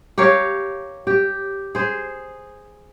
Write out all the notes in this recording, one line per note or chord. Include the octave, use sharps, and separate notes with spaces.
G4 A#4 C#5 F5
G4
G#4 C5